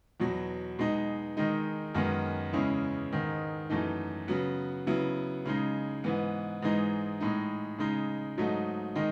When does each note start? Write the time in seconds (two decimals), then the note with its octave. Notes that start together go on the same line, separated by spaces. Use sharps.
0.20 E2 B2 F#3
0.79 B2 G#3 D#4
1.37 D#3 G#3 D#4
1.95 F#2 D#3 G#3 B3
2.53 E2 C#3 G#3 C#4 E4
3.12 G#2 D#3 G#3
3.70 F#2 E3 A3 D#4
4.28 C#3 F#3 B3
4.87 C#3 F#3 B3 E4
5.45 C#3 G#3 D#4
6.04 G#2 E3 B3
6.62 G#2 E3 G#3 D#4
7.20 A2 G#3 D#4
7.78 C#3 G#3 D#4
8.38 G#2 F#3 A3 D#4
8.95 D#3 G#3 D#4